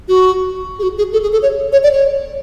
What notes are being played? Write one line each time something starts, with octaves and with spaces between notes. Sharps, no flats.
F#4
G#4
F#4
G#4
A4
G#4
A4
C#5
C#5
D5
C#5